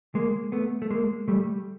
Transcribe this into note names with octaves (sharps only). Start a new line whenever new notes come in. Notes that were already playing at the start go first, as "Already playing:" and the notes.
G#3 A#3
A3 B3
A3
G#3 A#3
G3 A3